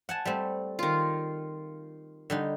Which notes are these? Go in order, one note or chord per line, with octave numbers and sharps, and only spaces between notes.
F#5 G#5 A5
G3 A3 C4
D#3 F4
D3 G3 D#4